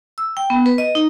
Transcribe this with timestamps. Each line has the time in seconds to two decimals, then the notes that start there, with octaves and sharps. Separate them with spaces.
0.18 E6
0.37 G5
0.50 B3
0.66 B4
0.78 D#5
0.95 D#4